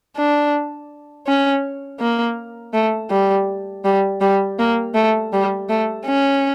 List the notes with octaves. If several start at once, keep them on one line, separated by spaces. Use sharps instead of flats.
D4
C#4
A#3
A3
G3
G3
G3
A#3
A3
G3
A3
C#4